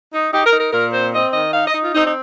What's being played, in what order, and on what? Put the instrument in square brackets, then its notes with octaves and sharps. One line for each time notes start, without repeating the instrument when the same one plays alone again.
[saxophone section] D#4
D#4 G4
A#4
D#4
A#4
A#2 A#4
C4 C5
C4 D#5
D#3 D#5
D#4 F5
D#5
D#4
F4
C4 D#4
D#4